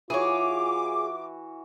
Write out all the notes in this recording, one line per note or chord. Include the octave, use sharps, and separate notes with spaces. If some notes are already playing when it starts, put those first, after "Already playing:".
E3 F4 F#4 G#4 C#5 D6